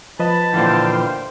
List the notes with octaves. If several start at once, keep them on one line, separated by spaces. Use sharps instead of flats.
F3 B4 D#5 A5 B5
A#2 D3 E3 C5 F5 G5